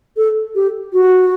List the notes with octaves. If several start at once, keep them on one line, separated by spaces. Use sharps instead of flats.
A4
G4
F#4